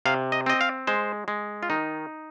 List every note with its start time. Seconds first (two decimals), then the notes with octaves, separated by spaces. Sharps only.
0.06 C3 F5
0.32 D#5
0.46 C4 D#5
0.61 F5
0.87 G#3 C5
1.28 G#3
1.63 F4
1.70 D#3 D#4